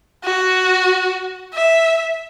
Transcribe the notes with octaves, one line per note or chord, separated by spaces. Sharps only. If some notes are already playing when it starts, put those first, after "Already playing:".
F#4
E5